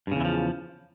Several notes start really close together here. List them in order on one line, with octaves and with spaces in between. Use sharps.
G2 C#3 E2 E3 F3